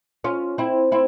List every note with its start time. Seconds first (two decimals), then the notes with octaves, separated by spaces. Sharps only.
0.24 C#4 F4
0.58 C4 E4
0.92 C4 E4